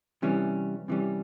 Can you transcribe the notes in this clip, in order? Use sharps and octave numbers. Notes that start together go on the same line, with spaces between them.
C3 E3 G3 C#4
C3 E3 G3 C#4